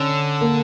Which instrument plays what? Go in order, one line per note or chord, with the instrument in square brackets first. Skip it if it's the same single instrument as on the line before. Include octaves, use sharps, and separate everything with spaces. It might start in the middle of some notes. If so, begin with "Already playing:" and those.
Already playing: [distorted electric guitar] D3 [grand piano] C#4
[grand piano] A#3